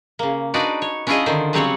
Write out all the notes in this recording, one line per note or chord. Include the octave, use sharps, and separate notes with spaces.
C#3 A#3
D4 D#4 F#4 B4 D5
C#5
C#4 D4 E4 F4 G#4 D#5
D3 D#3 C5
C#3 F#3 G3 C4 C#5 F#5